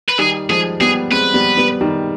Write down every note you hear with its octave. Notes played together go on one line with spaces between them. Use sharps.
B4
D#3 G3 G#4
F3 G#3 G#4
G3 B3 G#4
G#3 C4 B4
G3 B3
G3 B3
D#3 G3